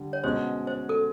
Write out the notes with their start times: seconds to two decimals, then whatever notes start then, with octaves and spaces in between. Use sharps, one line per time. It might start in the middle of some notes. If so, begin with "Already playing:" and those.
Already playing: D3 G3
0.13 C#5
0.24 B2 G#3 C#4 F#4 C5
0.67 C5
0.89 A4